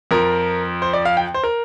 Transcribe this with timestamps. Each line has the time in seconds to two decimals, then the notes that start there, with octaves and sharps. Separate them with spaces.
0.11 F2 F3 A#4
0.82 C5
0.93 D5
1.05 F5
1.17 G5
1.34 C5
1.44 A#4